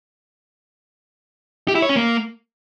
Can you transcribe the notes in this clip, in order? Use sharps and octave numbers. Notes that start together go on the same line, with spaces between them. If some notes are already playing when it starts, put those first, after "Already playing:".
G4
E4
C#5
C#4
A#3